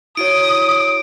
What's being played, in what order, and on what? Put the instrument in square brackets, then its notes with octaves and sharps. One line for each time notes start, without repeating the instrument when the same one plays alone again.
[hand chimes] E4 F#4 C#5 [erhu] D#6 [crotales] D7